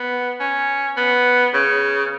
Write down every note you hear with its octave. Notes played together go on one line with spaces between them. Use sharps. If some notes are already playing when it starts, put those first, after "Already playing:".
Already playing: B3
C#4
B3
C#3